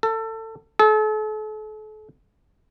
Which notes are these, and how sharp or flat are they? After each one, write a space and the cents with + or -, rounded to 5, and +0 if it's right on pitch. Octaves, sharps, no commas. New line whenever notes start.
A4 +25
A4 -40